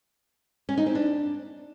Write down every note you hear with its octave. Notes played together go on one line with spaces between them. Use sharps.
C#4
D#4
C4
D4